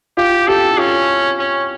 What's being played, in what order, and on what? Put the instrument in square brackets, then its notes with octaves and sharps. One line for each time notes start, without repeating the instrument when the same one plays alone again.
[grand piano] F4 [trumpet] G4
[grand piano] G4 [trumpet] A4
[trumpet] C#4 [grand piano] F4
[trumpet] C#4